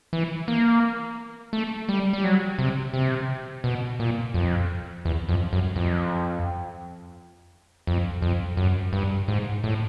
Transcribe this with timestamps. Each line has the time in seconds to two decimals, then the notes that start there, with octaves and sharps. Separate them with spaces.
0.13 E3
0.48 A#3
1.53 A3
1.89 G3
2.13 G3
2.24 F#3
2.59 C3
2.93 C3
3.64 B2
4.00 A#2
4.34 F2
5.05 E2
5.29 F2
5.53 F#2
5.76 F2
7.87 F2
8.22 F2
8.57 F#2
8.93 G2
9.28 G#2
9.64 A2